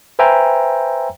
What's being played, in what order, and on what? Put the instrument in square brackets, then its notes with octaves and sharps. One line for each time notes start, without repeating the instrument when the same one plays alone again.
[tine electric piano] B4 C5 E5 G5 G#5 A#5